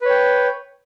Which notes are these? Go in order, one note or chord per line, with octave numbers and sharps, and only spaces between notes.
B4 C#5 G5